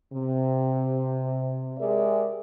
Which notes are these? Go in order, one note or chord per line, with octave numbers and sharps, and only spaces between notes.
C3
G#3 G4 G#4 A#4 D5 E5